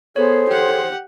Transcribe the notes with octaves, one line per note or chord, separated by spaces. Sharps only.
B3 G#4 A4 C5 C#5
G4 F#5